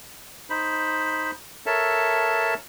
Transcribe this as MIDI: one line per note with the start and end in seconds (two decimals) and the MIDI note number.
0.50 1.31 63
0.50 1.31 72
0.50 1.31 83
1.66 2.54 69
1.66 2.54 70
1.66 2.54 73
1.66 2.54 76
1.66 2.54 81